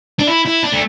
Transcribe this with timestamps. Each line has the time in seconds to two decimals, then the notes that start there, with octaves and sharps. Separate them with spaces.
0.19 D4
0.27 E4
0.45 E4
0.63 D4
0.72 A3